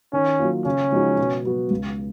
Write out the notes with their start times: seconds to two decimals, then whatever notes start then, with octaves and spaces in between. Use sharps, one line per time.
0.13 D#3 C#4
0.39 F#3 A#3 F4
0.65 C#3 C#4
0.92 F3 G#3 D#4 F#4
1.18 B2
1.45 F#3 B3 F#4
1.70 C#2